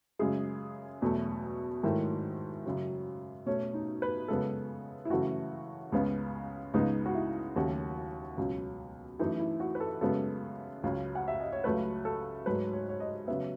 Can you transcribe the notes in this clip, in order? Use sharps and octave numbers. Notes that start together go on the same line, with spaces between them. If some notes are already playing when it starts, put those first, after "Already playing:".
F#2 C#3 G#3 G#4
E2 B2 F#3 A3
G#2 D#3 F#3 A3 E4
F#2 C#3 F#3
B2 A3 C#4
D#4
B4
F#2 C#3 G#3 B3 A4
E4
F#2 C#3 E3 A3 F#4
C#2 C#3 G#3 B3
C#2 C#3 G#3 B3 D#4
F#4
E4
D#2 C#3 F#3 A3 F#4
C#2 B2 F#3
F#2 E3 A3 D#4
E4
F#4
B4
A4
F#2 C#3 G#3 B3 A4
C#2 C#3 F#3
F#5
E5
D#5
C#5
C#2 C#3 F#3 A3 B4
A4
G#2 F#3 A3 B4
C#5
C#5
D#5
C#3 F#3 B3 E5